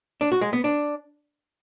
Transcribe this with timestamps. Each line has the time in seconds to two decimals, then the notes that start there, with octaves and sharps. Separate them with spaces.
0.21 D4
0.32 F#4
0.41 G#3
0.53 B3
0.64 D4